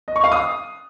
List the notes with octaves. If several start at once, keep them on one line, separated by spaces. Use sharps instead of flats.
D#5
C#6
F5
D#6